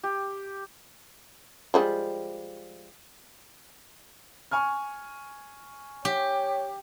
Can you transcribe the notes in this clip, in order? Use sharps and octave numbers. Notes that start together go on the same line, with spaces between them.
G4
F3 G3 G#3
G#5 C#6 F6
G4 C#5